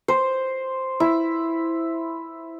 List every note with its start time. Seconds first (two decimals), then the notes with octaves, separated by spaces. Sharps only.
0.08 C5
1.00 E4